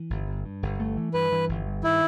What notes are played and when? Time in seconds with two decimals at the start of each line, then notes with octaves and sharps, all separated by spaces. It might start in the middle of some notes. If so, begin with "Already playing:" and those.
Already playing: E3
0.10 G1
0.27 G2
0.45 G2
0.63 G1
0.80 A3
0.97 E3
1.14 G2 B4
1.32 E3
1.49 G1
1.67 G2
1.83 D#3 E4